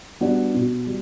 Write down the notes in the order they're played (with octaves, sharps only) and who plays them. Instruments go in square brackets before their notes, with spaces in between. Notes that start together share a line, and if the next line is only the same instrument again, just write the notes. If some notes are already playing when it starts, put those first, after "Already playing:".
[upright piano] G3 B3 D4 F#4
B2
G3